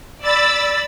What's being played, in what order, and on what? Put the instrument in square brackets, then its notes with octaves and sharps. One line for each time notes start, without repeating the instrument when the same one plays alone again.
[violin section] D5 B5 E6 A6